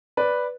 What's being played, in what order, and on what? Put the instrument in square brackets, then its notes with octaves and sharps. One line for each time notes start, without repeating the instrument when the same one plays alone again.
[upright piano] B4 D5